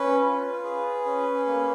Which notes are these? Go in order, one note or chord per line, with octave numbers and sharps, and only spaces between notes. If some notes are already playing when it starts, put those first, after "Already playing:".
Already playing: C#4 B4
F4
G#4
C#4
A#3